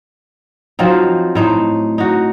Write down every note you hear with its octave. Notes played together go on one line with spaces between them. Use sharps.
F3 F#3 C4 D#4
A2 D#4 C5
D#4 F#4